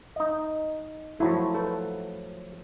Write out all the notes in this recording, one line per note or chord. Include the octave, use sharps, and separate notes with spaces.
D#4 D#5
F3 F#3 A3 E4
A4 B4